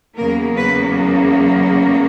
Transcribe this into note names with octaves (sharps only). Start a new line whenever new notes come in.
E2 C#3 F#3 A#3 A#4
B4